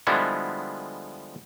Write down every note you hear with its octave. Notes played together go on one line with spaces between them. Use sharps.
D3 F3 G3 G#3 B3 E4